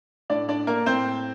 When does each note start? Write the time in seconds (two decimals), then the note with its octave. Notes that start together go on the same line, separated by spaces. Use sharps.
0.30 A2 D4 D5
0.49 D4 D5
0.67 A#3 A#4
0.86 A2 C4 C5